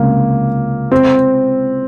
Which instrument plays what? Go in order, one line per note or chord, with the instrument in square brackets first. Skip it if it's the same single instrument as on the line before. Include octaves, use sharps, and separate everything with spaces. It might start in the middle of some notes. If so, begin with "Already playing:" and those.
Already playing: [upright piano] C#2 C3 C#4 [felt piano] A#3
[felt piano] C4